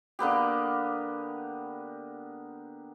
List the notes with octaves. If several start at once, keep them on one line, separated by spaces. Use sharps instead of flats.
D3 A#3 B3 G4